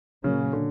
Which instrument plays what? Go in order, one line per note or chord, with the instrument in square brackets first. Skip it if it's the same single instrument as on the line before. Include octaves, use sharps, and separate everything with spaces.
[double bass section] A#2 F#3 A#3 C#4 [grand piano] C#3
[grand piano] D3